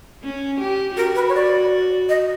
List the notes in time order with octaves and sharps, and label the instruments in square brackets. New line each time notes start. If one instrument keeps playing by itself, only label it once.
[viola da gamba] C#4
G4
[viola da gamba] F#4 [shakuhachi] A#4
[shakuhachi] B4
C#5
D5
D#5